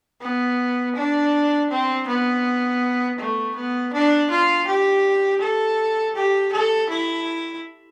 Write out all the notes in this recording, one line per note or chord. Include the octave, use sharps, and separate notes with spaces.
B3
D4
C4
B3
A3
B3
D4
F4
G4
A4
G4
A4
E4